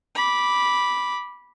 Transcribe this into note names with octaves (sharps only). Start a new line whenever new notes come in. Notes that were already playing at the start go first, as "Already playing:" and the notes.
B5 D6